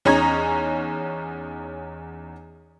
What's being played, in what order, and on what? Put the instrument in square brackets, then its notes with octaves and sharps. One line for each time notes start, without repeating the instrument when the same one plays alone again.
[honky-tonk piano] E2 C#4 D#4 C#5 A#5 G#6